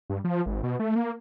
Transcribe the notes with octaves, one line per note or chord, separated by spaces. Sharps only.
G2
F3
G#1
B2
A3
A#3